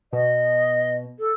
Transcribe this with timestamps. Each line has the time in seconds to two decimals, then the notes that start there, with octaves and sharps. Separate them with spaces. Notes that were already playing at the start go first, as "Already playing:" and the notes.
0.13 B2 D#5
1.19 A4